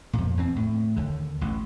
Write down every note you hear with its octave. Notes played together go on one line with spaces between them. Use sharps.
F2 A#2
E2 C4
A2
D#2 D3
A1 E3